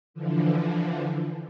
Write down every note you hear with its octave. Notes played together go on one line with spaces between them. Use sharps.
D3 E3 F3